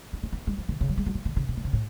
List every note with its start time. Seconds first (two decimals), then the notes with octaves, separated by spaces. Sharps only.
0.13 B3
0.23 C#4
0.33 B3
0.47 G#3
0.58 F3
0.69 D3
0.81 C#3
0.89 F#3
0.97 G#3
1.06 F#3
1.15 F3
1.25 D3
1.36 C#3
1.49 B2
1.57 D3
1.64 C#3
1.73 A2